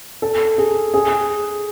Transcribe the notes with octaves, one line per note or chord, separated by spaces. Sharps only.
A4
G#4
G#4